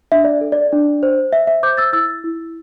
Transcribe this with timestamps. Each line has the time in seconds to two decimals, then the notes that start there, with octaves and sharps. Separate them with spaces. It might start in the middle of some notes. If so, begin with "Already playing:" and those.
0.12 D4 E5
0.24 D5
0.41 A4
0.52 D5
0.72 D4
1.03 C5
1.33 C5 E5
1.47 E5
1.63 C5 D6 G6
1.77 E6 A6
1.93 E4 E6 A6
2.24 E4